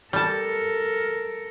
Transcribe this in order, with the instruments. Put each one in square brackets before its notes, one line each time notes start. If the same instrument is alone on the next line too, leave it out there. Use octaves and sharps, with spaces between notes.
[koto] G3 A5 [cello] A4 A#4